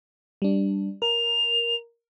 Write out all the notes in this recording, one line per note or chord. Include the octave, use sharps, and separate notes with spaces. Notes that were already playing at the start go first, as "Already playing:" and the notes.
G3 D4
A#4 F7